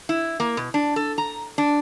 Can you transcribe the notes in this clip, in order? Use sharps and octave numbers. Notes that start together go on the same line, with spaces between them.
E4
A#3
B2
D4
A4
A#5
D4